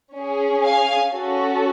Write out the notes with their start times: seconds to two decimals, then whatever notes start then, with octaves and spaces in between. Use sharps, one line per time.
0.15 C#4 G#4
0.65 F5 G#5
1.14 C#4 F#4 A4